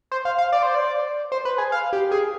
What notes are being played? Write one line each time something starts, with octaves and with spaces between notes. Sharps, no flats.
C5
F5
F5
D5
C5
D5
C5
B4
G#4
F5
G4
G#4